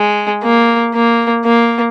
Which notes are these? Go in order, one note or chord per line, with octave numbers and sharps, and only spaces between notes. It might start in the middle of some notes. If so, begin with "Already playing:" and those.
Already playing: G#3
A#3
A#3
A#3